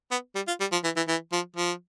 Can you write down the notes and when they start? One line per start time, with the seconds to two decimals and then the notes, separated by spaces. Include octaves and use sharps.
0.11 B3
0.35 G3
0.47 F4
0.60 G3
0.72 F3
0.84 E3
0.96 E3
1.08 E3
1.32 F3
1.56 F3